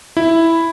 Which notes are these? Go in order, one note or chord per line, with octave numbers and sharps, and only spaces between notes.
E4